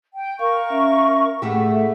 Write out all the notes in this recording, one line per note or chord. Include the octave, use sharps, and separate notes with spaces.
G5
A#4 F5 C#6
C#4 E5
A2 A3 G4 G#4 F#5
E5